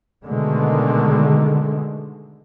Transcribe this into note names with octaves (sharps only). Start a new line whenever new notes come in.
B2 D3 D#3 G#3 A3